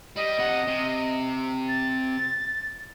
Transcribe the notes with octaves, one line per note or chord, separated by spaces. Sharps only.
G3 D#5
C3 F#5
C3
A6